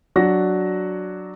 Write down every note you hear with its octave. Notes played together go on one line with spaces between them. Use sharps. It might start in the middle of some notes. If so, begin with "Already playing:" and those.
F#3 D4 F#4 A#6